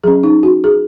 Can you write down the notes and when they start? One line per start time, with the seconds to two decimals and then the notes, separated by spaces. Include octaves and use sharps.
0.04 F#3 C#4 G#4
0.23 D#4
0.43 F#4
0.64 G#4